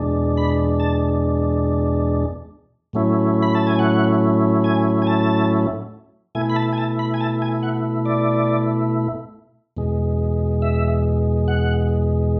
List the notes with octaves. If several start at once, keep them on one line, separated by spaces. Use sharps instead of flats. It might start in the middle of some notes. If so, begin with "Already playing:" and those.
Already playing: E2 B2 G#3 D4
B5
A5
A2 F#3 A3 C#4 E4
B5
A5
G#5
F#5
G#5
G#5
A5
B2 A3 E4 G#5
B5
A5
G#5
A5
B5
G#5
A5
G#5
F#5
D5
E2 B2 G#3
E5
F#5